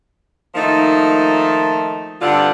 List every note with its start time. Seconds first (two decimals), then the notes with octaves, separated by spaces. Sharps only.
0.55 D#3 F3 A3 A#3 D#4
2.21 G2 D3 C4 F4 F#5